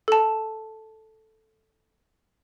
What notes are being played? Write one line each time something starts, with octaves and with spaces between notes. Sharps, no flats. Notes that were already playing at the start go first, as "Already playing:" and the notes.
A4 A5